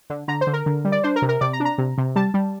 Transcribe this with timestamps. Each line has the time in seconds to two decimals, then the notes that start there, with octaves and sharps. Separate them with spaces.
0.10 D3
0.28 D3 A#5
0.41 C5
0.47 D3
0.53 A#4
0.66 D3
0.85 G3
0.92 D5
1.03 D4 C5
1.16 A#4
1.22 C3
1.29 A#4
1.41 C3 D5
1.53 A#5
1.60 D4
1.65 A#5
1.78 C3
1.98 C3
2.16 G3 A5
2.34 G3